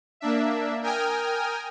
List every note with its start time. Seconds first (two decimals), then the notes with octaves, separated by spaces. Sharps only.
0.20 A#3 D4 E5
0.82 A#4 G5 G#5 D#6 F6